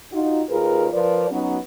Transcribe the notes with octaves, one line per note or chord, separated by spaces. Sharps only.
D#4 F4 F#4
D#2 F4 G#4 A#4 B4
F3 F4 A#4 B4 D5
F#3 B3 C#4 D#4 F#4